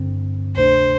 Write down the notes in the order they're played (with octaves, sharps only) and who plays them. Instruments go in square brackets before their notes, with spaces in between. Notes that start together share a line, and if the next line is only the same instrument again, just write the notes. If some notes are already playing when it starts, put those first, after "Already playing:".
Already playing: [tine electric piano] G2 D3 C4
[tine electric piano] D2 C3 A3 D4 [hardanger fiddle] C5